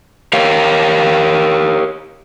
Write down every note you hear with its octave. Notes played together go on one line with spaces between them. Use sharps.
G4 A#4 C#5 F5